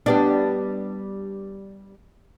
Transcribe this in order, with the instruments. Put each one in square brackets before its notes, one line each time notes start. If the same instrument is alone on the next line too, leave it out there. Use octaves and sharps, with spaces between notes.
[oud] G3 B3 D4